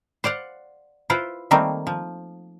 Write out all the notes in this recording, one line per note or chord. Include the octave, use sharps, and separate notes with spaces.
C5 D5 F5 F#5
E4 F4 B4 C5
D#3 G3 A3 A#3 C4 D#4
F3